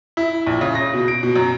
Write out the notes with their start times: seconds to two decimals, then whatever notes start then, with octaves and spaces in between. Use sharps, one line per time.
0.17 E4
0.47 A#1
0.61 C#3
0.75 A#6
0.94 B2
1.08 D7
1.23 B2
1.36 F#2